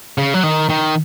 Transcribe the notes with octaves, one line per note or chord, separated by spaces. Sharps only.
C#3
F#3
D#3
D#3